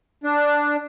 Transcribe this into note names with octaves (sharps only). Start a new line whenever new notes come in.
D4